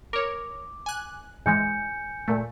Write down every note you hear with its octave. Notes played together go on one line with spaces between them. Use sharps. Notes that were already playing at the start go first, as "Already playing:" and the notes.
A#4 C#5 D6
G#5 F#6
G#2 E3 G#3 G#5 G6 C#7
A#2 A3